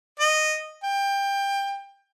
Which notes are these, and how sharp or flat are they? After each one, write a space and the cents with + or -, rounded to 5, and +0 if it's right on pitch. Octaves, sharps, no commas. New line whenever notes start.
D#5 -10
G5 +20